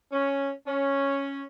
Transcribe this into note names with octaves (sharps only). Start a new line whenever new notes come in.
C#4
C#4